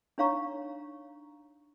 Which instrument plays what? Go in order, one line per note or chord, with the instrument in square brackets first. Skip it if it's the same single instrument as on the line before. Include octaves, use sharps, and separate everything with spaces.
[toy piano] D4 D#4 C#5 F5 A#5 C#6